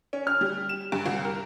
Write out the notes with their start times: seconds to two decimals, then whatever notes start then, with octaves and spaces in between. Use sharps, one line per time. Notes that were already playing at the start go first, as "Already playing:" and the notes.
0.13 C#4
0.27 F6
0.41 G3
0.69 E7
0.92 G2
1.06 C2
1.25 A#4